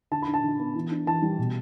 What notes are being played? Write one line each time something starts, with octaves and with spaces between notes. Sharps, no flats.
D3 A5
B5
D4
A5
D3
B3
E3
D4
E3 A5
G3
B2